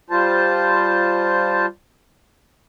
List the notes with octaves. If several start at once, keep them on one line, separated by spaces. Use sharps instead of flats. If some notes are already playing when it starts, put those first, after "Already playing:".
G3 F4 C5 A5